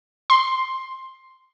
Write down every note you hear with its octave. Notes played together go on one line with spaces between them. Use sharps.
C6